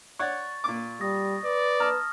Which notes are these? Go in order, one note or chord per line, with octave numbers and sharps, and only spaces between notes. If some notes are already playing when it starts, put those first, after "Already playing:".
C#5 D5 F#5 C#6 A6
A#2 D6
G3 D#6 A#6
B4 D5
A5 A#5 D#6 F6